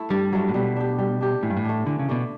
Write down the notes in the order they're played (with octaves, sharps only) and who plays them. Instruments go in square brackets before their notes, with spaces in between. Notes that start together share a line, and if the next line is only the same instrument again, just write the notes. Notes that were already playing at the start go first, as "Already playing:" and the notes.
Already playing: [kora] A3 E4
[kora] G2 [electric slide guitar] G3
[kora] F#3 A3 E4
[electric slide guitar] A2
[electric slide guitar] B2 [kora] G3
[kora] D4 G4
G3
D4 G4
[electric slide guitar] A2 [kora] E3
[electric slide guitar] G2
A2
[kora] A3 D4
[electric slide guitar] D3 [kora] E3
[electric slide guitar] C#3
[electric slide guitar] B2 [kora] A3 D4